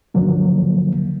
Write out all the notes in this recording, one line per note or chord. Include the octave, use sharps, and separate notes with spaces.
C#2 G2 D3 F3 F#3 A#3